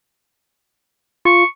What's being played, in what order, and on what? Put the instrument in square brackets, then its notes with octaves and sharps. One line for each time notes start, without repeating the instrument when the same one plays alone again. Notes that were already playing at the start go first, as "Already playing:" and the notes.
[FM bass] F4 [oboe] C#6